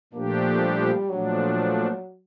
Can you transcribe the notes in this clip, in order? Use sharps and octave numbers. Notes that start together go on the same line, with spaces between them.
A#2 F3 A3 A#3 D4 G4
G3
A#2 F3 F#3 A3 D4